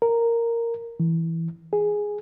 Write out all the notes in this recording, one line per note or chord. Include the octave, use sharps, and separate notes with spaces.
A#4
E3
G#4